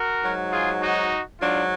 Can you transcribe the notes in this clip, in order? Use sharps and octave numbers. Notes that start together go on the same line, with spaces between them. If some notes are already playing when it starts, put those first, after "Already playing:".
Already playing: F#4 A#4
G#2 F#3
F4 G#4
D#4 F#4
G#2 F#3 D4 F4